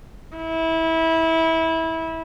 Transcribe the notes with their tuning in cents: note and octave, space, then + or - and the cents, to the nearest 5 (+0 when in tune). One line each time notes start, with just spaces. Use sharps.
E4 -20